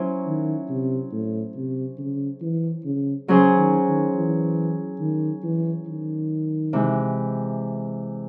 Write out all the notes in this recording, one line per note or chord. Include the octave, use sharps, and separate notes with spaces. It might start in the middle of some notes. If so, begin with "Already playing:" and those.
Already playing: F#3 C#4 E4 C5
D#3
C3
A2
C3
C#3
E3
C#3
C#3 F#3 C#4 G#4 C5
D#3
D#3
E3
D#3
E3
D#3
C3 E3 G#3